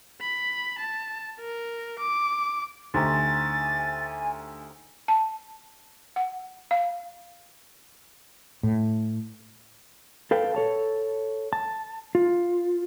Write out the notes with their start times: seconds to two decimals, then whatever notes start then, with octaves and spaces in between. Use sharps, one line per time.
0.21 B5
0.79 A5
1.40 A#4
1.99 D6
2.94 D2 D#4 G4 C5 G#5 A6
5.08 A5
6.16 F#5
6.71 F5
8.63 A2
10.31 A4 B4 F5 G5
10.55 A4 C#5 A5
11.53 A5
12.15 F4